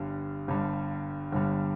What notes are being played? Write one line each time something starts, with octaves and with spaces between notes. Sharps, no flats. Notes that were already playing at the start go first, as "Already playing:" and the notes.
Already playing: G1 G2 D3 G3
G1 G2 D3 G3
G1 G2 D3 G3